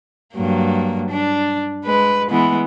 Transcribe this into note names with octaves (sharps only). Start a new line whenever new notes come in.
G2 F#3 A#3
D4
G#3 B4
E3 G#3 B3